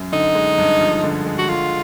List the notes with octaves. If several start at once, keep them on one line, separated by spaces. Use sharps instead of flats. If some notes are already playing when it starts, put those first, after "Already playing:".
Already playing: F#2
D3 D#4
G#3
G2
F3
D3
G#3
F#4
D3 F4